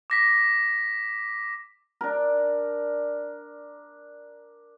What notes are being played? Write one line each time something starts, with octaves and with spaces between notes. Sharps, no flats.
D6 A#6 B6
D4 A#4